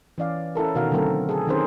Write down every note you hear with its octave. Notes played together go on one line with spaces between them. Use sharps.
E3 C#4 D5 F5
C#4 E4 A4 A#4
B2 D#3 F#4 A#4 F5
D3 F#3 A3 C4 A4 A#4
G#4 A4
D#3 C4 C#4 G#4 A#4 C5